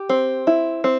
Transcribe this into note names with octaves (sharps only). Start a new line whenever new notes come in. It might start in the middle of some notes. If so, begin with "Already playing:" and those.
Already playing: G4
C4
E4
C4